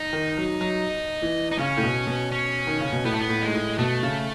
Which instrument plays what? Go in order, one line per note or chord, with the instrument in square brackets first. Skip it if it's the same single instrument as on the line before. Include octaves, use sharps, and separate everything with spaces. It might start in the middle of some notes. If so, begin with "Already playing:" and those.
Already playing: [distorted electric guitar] D#4
[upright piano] D#3
F#3
F#3
E3
[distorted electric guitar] D#4
[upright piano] C#3 [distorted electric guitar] C#4
[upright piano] A2
B2
B2
[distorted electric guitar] C#4
[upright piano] D#3
C#3
B2
[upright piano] A2 [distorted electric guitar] B3
[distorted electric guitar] A3
B3
[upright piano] A2
[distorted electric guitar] G#3
[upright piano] G#2
A2
[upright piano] B2 [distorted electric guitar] A3
[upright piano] C#3